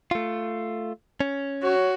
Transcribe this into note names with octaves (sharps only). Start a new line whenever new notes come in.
A3 F4
C#4
F#4 C#5